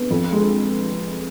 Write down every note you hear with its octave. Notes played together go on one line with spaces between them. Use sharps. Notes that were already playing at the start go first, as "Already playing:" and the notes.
Already playing: B3
F2
G#3